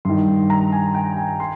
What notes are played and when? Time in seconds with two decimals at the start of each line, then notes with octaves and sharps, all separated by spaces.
0.05 G2 D#3 C6
0.50 A#5
0.72 G#5
0.94 G5
1.17 G#5
1.40 C6